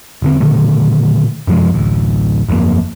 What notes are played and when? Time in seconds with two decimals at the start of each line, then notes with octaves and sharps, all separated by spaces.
0.22 E1 D3 C4
0.40 A#2 D3 D#3 A3
1.47 F#2 C3 F3 G#3
1.74 A1 D2
2.49 G1 F2 A2 A#3